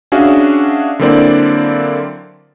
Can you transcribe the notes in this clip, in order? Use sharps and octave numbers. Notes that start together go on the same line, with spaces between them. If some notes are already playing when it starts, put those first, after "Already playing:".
C#4 D4 F#4 G#4 E5 F5
D3 F#3 A#3 C4 E4 D5